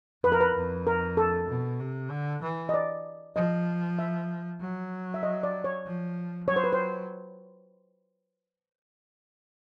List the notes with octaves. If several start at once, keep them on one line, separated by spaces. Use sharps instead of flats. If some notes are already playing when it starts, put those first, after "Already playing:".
F2 B4
A#4
B4
F2
A#4
A4
B2
C3
D3
E3
D#5
D5
F3 D#5
E5
F#3
E5
D#5
D5
C#5
F3
F#3 C#5
C5
B4
C5